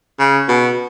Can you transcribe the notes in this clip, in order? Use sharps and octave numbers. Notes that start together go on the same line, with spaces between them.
C#3
B2